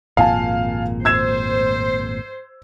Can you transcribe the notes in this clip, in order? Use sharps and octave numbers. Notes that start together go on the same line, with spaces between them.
G#1 F2 A#2 F5 G#5 A5
C5 E6 G#6 E7